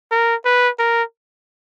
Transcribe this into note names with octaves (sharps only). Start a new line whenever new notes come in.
A#4
B4
A#4